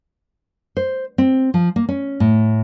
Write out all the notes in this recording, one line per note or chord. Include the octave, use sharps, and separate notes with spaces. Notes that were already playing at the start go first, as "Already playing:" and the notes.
C5
C4
F3
A#3
C#4
A2